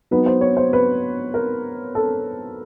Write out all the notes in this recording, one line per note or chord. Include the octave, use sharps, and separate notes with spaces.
F#3 B3 D#4 B4
C5
C#5
C5
B4
A#4
A4